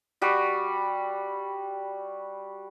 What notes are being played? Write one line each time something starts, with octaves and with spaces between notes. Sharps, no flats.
G3 F#4